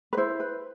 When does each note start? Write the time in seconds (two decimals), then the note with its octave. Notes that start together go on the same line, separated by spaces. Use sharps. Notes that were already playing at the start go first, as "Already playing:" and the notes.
0.13 B4
0.17 E4 C5
0.40 B4